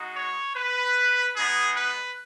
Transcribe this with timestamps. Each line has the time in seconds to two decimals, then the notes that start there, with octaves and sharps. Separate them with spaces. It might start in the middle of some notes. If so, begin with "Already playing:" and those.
Already playing: G#3 D#4 F#4
0.15 C#5
0.55 B4
1.36 G#3 B3 D#4 G#4
1.76 B4